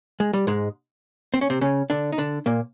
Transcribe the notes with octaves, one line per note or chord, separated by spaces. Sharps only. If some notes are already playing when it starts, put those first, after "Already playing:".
G#3
G3
G#2 G#3
C4
C#4
C3 C4
C#3 C#4
D3 D4
D#4
D3 D4
A#2 A#3